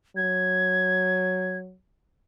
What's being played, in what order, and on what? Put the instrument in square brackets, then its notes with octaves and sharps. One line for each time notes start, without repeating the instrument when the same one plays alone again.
[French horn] F#3 [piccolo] G#6